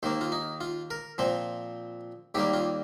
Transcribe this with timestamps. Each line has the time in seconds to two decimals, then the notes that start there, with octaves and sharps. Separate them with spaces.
0.03 D#2 D#3 A#3 C5
0.21 F4
0.32 D#4
0.61 F4
0.91 A#4
1.18 A#2 F3 C4 C5
2.35 D#2 D#3 G3 A#3 G4
2.54 F4